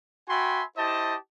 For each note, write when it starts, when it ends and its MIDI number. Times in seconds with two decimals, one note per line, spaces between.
0.29 0.64 66
0.29 0.64 76
0.29 0.64 79
0.29 0.64 80
0.29 0.64 83
0.29 0.64 84
0.78 1.16 64
0.78 1.16 67
0.78 1.16 72
0.78 1.16 75
0.78 1.16 81